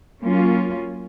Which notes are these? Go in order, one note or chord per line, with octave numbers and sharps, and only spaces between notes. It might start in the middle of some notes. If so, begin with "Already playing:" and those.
F#3 A#3 C#4 F4